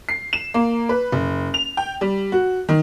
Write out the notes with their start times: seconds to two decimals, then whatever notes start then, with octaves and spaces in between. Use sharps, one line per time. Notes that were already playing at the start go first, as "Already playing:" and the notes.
0.09 C7
0.33 E7
0.54 A#3
0.89 B4
1.12 F#1
1.54 F7
1.77 G5
2.01 G3
2.32 F#4
2.69 D#3